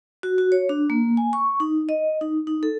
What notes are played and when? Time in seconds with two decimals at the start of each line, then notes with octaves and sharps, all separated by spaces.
0.23 F#4
0.38 F#4
0.52 C#5
0.69 D4
0.90 A#3
1.17 G#5
1.33 C#6
1.60 D#4
1.89 D#5
2.21 D#4
2.47 D#4
2.63 A4